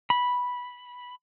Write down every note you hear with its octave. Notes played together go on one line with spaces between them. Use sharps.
B5